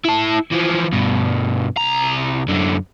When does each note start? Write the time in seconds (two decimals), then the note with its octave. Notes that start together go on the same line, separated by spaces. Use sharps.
0.05 E4 A5
0.52 E3 F3
0.93 G2 B2
1.77 C2 A#5
2.49 F#2 D3